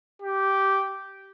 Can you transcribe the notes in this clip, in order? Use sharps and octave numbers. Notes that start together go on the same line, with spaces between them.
G4